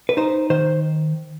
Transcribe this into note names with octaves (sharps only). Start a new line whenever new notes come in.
B4
D#4 C5
D#3 C5